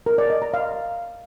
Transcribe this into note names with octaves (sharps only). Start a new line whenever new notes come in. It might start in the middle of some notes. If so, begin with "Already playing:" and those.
A#4
D5
D#5
A#5
F5